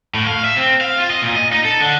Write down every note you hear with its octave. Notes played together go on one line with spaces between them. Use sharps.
A2
F5
E5
C4
F5
F4
D#5
A#2
D#5
D#4
A4
D3